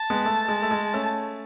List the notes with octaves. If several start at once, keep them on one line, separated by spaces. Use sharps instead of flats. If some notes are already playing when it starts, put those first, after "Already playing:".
Already playing: A5
G#3 B3
A3
G#3
A3
G#3
A3 C#4